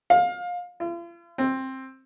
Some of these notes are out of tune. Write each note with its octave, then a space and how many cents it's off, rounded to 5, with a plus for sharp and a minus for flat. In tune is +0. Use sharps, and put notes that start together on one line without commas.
F5 +25
F4 -40
C4 +15